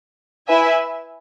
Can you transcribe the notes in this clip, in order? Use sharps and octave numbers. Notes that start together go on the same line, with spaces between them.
E4 B4 E5 G#5